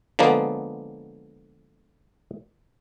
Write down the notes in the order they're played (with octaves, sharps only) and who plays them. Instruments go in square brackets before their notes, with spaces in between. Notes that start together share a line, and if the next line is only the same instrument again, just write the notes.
[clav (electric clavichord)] D3 F3 G#3 A#3 B3